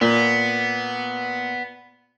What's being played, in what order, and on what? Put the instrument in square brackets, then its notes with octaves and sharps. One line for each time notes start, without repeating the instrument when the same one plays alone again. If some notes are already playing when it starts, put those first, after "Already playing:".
[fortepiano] A#2 [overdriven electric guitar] B3